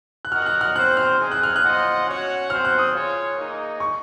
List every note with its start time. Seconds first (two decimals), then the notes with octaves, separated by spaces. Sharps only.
0.25 F#6
0.32 F#4 A#4 D#5 F#5 F6
0.42 F6
0.46 F#6
0.61 F6
0.75 C4 F#4 C5 F#6
0.97 F6
1.19 C4 D#4 G#4
1.31 F#6
1.43 F6
1.56 F#6
1.63 F4 C5 D#5 F#5
2.07 C#4 F#4 C#5 F#5
2.50 C4 F#4 C5 F6
2.65 F#6
2.78 D#6
2.93 F4 G#4 C#5
3.37 A#3 D#4 G#4 D#5
3.80 C#6